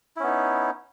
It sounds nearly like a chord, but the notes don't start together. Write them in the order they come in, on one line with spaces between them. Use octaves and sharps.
E4 C#4 B3 D#4